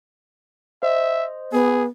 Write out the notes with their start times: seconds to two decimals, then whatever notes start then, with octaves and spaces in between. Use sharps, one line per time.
0.83 C5 D#5 E5
1.53 B3 G#4